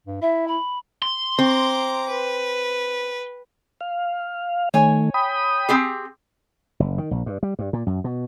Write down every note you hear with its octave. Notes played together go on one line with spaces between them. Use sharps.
G2
E4 E5
B5
C6
C4 A#5 D6
B4
F5
D#3 A3 C#5 G#5
G5 B5 D#6
C4 G4 G#4
F#1
D#3
A#1
G2
G3
G2
A#2
F#2
B2